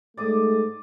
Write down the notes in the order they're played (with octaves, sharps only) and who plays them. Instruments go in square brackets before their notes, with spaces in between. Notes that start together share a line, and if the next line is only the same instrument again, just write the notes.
[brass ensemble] G#2 A3 [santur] D5 D6 D#6